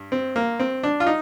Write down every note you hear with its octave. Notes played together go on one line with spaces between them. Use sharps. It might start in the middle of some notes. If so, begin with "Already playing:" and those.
Already playing: G2
C4
A#3
C4
D4
F4
D#4